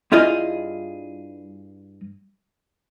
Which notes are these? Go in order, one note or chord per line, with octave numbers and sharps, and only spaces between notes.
G2 E4 F4 G#4 D#5